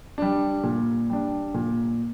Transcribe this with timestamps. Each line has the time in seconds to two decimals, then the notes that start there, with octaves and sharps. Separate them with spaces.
0.18 G3 D4
0.64 A#2
1.10 G3 D4
1.54 A#2